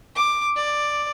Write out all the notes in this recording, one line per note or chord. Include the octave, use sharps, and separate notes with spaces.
D6
D5